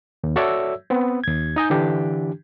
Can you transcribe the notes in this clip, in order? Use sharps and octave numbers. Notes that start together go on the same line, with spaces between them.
D#2
F#4 A4 C#5 D5 E5 E6
B3 C4
D#2 G#6
D#4 D#5 G#5 G6
D3 E3 D4 G4